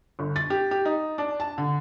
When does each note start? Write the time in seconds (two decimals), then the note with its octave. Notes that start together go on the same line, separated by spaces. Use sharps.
0.19 G1
0.36 A6
0.50 G4
0.71 G4
0.85 D#4
1.18 D4
1.40 A5
1.58 D3